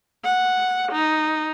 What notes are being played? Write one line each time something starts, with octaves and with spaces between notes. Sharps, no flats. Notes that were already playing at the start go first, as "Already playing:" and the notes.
F#5
D#4